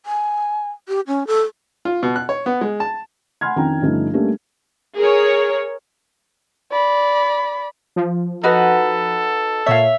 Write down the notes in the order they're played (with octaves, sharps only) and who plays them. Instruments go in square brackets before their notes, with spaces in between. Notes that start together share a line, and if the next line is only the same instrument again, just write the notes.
[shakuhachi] G#5
G4
C#4
A4
[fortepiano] F4
B2
F#6
C#5
B3
G#3
A5
[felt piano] F#5 G#5 B5 C6 F6 G#6
F2 D#3 C#4 D4 G5 A#5
G2 D3 F3 A3 C#4 D#4
G3 A3 A#3 C#4 D4
[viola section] G#4 A#4 C#5
[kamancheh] D5 B5
[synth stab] F3
[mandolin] D#4 F#4 B4 [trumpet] A4
[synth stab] A#2 C#5 [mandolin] E5 F5